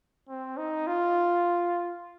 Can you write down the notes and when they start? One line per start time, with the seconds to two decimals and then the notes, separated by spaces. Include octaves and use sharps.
0.29 C4
0.57 D#4
0.87 F4